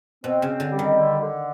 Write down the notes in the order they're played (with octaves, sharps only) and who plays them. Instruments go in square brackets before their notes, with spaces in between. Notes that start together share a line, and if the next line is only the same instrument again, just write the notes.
[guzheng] B2 [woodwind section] C4
[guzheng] C#3
[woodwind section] C4
[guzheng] D3
[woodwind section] G3
[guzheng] D#3
[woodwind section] D3
D3